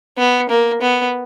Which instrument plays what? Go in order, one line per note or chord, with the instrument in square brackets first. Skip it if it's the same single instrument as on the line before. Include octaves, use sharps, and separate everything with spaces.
[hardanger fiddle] B3
A#3
B3